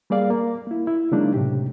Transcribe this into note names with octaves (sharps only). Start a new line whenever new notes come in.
G3 A#3 G#4 D5 F5
A#3
A#3 E4
E4
C#3 F#3 G#3 A#3 D4 D#4
A2 C3 G4